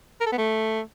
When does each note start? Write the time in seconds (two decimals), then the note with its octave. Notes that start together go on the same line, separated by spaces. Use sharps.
0.21 A#4
0.26 A4
0.32 B3
0.38 A3